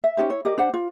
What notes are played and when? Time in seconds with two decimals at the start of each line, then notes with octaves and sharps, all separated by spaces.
0.04 E5
0.17 C#4 D#4 G4 C5
0.30 E4 C#5
0.45 G4 A#4 D5 D#5
0.58 D4 C5 F#5
0.74 F4